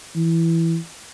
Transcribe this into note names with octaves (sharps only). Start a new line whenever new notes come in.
E3